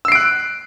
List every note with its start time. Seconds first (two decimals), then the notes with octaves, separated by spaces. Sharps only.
0.05 E6
0.08 C7
0.12 D7
0.15 F#6